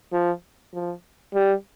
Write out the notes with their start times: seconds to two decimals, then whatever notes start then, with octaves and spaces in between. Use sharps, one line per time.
0.13 F3
0.74 F3
1.34 G3